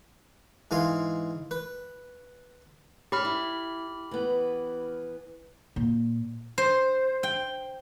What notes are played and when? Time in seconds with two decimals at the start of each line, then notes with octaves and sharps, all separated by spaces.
0.71 G#2 E3 G#3 F5 G#5 C6
1.51 B4
3.12 G4 C#5 B5 F6
3.25 E4
4.11 E3 B3
5.76 A#2
6.58 C5
7.23 G5